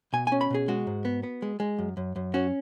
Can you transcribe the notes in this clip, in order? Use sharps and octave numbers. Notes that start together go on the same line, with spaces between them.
B2 G#5
C#4 G#5
B5
B2 G#4
G#3 F#4
G#2
B3
B3
G#3
G#3
F#2
F#2
F#2
C#4 F#4